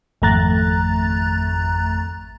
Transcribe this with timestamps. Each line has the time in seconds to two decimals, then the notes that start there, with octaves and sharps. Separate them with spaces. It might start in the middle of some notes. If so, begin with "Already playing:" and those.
0.22 G#1 F2 A3 A#5 F#6 A6